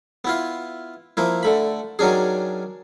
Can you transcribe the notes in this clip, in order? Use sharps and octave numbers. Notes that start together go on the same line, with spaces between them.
B3 E4 F4
F3 A#3 E4
D3 A3 B5
D#3 F#3 C#4 D4 G#4